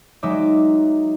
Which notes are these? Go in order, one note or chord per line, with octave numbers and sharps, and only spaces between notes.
F#3 G#3 D#4 E5 D6